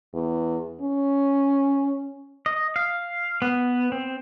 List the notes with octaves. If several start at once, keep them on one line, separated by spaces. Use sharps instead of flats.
E2
C#4
D#5
F5
B3
C4